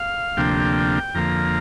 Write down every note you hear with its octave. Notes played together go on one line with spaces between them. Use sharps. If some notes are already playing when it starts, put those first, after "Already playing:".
Already playing: F5
D2 C3 F3 A#3 D4 G5
F2 D3 F3 A#3 A#5